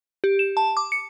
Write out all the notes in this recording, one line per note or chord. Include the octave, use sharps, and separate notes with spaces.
G4
E7
A5
D6
C#7